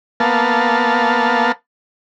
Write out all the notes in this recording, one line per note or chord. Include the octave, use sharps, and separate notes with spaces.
A#3 B3 F5 A5